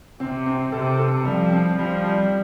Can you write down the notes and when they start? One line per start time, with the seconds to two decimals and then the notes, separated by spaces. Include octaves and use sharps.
0.20 C3 C4
0.46 C4
0.72 C3 A4
0.99 A4
1.25 F3 G3
1.52 C4
1.79 F3 G3
2.04 G3